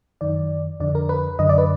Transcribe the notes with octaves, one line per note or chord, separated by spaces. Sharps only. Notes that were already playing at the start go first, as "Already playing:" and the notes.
F#2 D#3 D5
F2 D3 D5
A#4
B4
F#2 D3 D#5
D5
B4